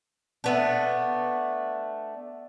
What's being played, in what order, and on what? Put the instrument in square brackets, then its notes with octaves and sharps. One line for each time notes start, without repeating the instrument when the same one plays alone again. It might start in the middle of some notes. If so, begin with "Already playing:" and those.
[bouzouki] A3 B3 D4